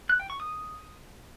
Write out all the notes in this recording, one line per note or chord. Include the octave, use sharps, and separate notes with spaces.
F#6
G5
C#6
D#6